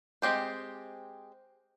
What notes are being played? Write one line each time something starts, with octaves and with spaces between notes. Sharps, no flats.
G#3 C4 G4 C5